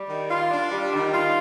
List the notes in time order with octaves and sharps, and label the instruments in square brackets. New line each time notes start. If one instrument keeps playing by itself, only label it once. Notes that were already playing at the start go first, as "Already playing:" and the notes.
Already playing: [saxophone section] G3
D#3
F4
D4
G3
D#3
F4